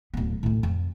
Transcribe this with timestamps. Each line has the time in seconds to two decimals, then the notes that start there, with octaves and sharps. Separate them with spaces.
0.14 D1 B3
0.43 D2 A2
0.63 F2